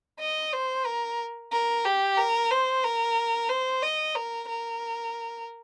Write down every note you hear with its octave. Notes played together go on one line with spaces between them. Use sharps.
D#5
C5
A#4
A#4
G4
A#4
C5
A#4
C5
D#5
A#4
A#4